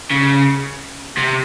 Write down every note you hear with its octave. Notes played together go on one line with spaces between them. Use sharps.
C#3
C3